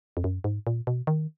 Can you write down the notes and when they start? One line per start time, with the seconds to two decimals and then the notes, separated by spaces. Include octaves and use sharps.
0.17 F2
0.24 F#2
0.44 G#2
0.67 A#2
0.87 B2
1.07 D#3